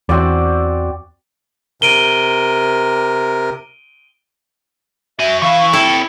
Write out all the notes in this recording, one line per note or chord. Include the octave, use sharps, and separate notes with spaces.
E2 C4 F#4 D5
C3 A#4 D7 D#7 G7
F#4 E5 G#5
E3 E4 F5 C#6
C3 E4 A4 G5